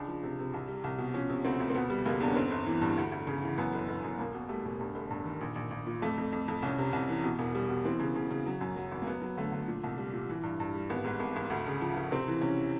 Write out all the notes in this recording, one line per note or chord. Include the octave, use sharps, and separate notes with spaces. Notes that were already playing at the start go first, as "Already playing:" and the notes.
Already playing: C#2 D4
F3
C3
C3
C2
G3
C2
B2
F3 C#4
C3
D2 C4
D2
C4
B2 B3
G3
F#1 A#3
E2 D4
C#4
G1 C4
G1
E3
G2
D2
D2
C#3
E3
F#2 B3
G1
G1
F#2
E1 A#3
B2
G3 A3
E1
G2
G1
G2
D#3
A#1
A#1
A#1
A#2
F2 A3
F2
F2
F2
C2 C#4
C3
C2
E3
B2
E1
G3
B2
E3 C4
C#3
C#3
C#3
F#3
F#2
F#3
G#1
A#3
F#3 B3
F#3
D3 A3
D3
A#2
C2
G3
A#2
E3
G2
G2
G3
G#1 B3
G#2
G#1
G#1
D2
C#3
F3
F3
C3 C4
E3
C3 C#4